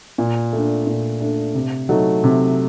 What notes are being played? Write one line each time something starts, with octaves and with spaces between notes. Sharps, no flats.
A#2
A3 D4
A#2
A3 D4
C3
F#3 A3 D#4
C3